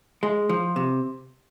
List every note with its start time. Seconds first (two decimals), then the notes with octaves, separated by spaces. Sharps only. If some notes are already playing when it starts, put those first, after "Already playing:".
0.23 G#3
0.49 F3
0.76 C3